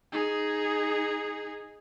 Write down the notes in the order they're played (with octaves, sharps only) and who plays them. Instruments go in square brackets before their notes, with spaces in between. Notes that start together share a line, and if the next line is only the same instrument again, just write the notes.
[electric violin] D#4 G#4